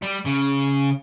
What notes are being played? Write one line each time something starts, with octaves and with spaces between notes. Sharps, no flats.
G3
C#3